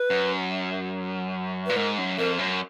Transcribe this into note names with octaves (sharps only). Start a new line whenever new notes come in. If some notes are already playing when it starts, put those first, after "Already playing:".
Already playing: B4
F#2
A#2 B4
G#2 A#4
F#2
F2 A#4
F#2